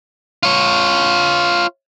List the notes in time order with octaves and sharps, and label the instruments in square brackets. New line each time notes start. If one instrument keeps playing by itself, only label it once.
[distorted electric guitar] F4 C#5